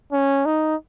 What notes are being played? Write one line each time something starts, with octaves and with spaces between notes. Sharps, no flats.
C#4
D#4